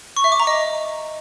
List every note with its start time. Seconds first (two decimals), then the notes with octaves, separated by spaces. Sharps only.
0.17 C#6
0.24 E5
0.32 D6
0.40 A#5
0.47 D#5